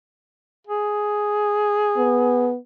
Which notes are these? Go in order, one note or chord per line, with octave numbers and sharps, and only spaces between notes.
G#4
B3